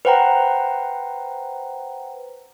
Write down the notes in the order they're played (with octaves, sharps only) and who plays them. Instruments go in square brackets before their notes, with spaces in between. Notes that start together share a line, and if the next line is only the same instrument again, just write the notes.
[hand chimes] B4 C5 F#5 G5 A#5